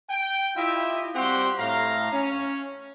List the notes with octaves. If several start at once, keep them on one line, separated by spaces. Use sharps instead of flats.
G5
E4 F4 G4 D#5 E5
G3 C4 F#4 G4 F#5 C6
A2 F5 A#5
C#4